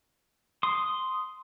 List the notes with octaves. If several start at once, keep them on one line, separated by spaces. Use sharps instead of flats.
C6 D#6